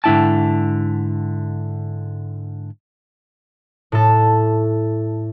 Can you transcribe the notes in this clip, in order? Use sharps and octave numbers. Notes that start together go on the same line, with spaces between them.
G#2 D3 A#3 E4 G5 A5
A2 A4